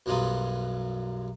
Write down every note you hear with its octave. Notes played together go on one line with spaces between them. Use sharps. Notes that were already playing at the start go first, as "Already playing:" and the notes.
B1 F#2 F#3 G3 F4 D#6